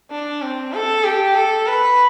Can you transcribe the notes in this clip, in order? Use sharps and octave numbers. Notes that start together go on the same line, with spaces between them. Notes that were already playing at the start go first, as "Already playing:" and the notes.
D4
C4
A4
G4
A4
B4